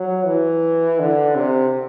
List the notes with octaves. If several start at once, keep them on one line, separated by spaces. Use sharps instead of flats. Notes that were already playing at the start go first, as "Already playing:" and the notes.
Already playing: F#3
E3
D3
C3